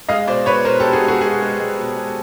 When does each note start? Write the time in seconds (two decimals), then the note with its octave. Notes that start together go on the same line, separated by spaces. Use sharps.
0.08 G#3 D#5 F5
0.27 B2 C5 D5
0.46 B2 B4 C#5
0.65 B2 A#4 C5
0.80 G4 A4
0.84 B2
0.93 F#4 G#4
1.03 G#3 F#4 G#4
1.21 G#3 F#4 G#4
1.41 G#3
1.60 G#3
1.77 B2
1.96 G#3